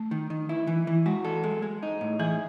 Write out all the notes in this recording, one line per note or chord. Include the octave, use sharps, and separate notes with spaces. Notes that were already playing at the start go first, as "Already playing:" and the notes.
Already playing: A3
D#3
D#3
E4
E3
E3
G#3 F#4
A4
G#3
G#3
D#4
A2
E3 G#4